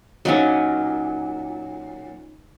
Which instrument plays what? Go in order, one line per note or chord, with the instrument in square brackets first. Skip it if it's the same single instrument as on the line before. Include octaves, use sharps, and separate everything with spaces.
[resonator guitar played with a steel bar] A#2 F#3 [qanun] C#4 D#4 D#5